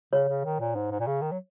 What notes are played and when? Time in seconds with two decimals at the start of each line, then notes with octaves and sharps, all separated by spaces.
0.13 C#3 C#5
0.28 C#3
0.44 D#3
0.60 A#2
0.75 G#2
0.91 G#2
1.00 A#2
1.07 C#3
1.22 D#3
1.31 F#3